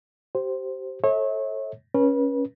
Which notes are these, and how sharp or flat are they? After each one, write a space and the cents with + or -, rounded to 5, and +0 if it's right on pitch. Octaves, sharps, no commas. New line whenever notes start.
G4 -30 C5 +0
A4 +0 C#5 -35 E5 -40
C#4 -5 B4 -35